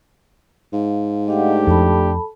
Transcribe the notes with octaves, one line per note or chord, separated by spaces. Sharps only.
G#2 F5
A3 D4 G4 D#5 F5 F#5
F2 A4 A5 B5